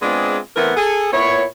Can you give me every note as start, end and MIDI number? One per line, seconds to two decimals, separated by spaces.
0.02 0.39 56
0.02 0.39 59
0.02 0.39 60
0.02 0.39 62
0.02 0.39 65
0.02 0.39 68
0.56 0.71 52
0.56 0.71 57
0.56 0.71 59
0.56 0.71 60
0.56 0.71 64
0.56 0.71 70
0.77 1.10 68
0.77 1.10 69
1.12 1.44 46
1.12 1.44 59
1.12 1.44 64
1.12 1.44 73